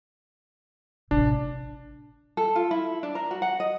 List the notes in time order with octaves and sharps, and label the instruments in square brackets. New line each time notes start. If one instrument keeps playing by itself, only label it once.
[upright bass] A1 C3 [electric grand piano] D4
[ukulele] A4
F4
E4
D4
A#4
F#4
F#5
D#5